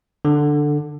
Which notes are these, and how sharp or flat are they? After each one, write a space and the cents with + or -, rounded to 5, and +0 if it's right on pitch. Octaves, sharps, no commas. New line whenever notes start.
D3 +5